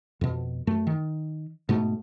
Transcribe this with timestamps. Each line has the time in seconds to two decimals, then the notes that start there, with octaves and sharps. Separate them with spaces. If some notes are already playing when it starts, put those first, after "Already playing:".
0.21 F2 B2
0.67 F#2 A3
0.87 D#3
1.69 G#2 B2 A3